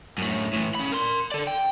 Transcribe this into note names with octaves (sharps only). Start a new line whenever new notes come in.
F#2 A2
A2 E3
C#4 B5
A#4 C6
A4 D5
G5